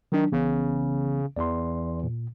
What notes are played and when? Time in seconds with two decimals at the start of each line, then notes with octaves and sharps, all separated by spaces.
0.12 D#3 F#3 D4
0.32 B1 C#3 E3 B3
1.36 E2 D5 C6
2.04 A#2